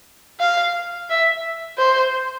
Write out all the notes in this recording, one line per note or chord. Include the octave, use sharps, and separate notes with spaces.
F5
E5
C5